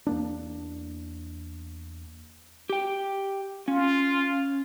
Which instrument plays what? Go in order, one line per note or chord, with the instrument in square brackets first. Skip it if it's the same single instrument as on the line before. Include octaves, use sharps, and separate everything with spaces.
[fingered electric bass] E2 A#3 D4
[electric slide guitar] G4 G5
[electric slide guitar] C#4 [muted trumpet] F4